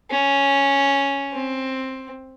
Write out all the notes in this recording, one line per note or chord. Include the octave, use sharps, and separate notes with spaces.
C#4
C4